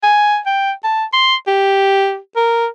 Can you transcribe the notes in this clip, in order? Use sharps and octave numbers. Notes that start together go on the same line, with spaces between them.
G#5
G5
A5
C6
G4
A#4